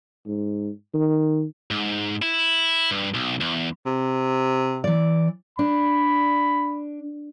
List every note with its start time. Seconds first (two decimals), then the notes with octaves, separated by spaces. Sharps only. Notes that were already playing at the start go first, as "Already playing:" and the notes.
0.26 G#2
0.94 D#3
1.71 G#2
2.22 E4
2.91 G2
3.14 B1
3.41 E2
3.86 C3
4.84 E3 D5
5.59 D4 B5